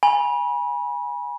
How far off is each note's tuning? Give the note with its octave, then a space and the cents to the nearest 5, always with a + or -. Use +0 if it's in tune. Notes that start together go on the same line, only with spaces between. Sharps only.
G#5 -15 B5 -30